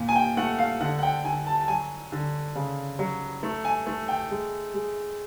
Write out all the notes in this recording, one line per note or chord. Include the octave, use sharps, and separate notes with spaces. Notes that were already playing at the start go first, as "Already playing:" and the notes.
Already playing: A#2
G#5
G5
A3 F#5
F5
D3 F#5
F#5
G5
D3 G#5
A5
A5
F#3 G#5
D3
C#3
F#3
A3
G#5
A3
G5
G#3
G#3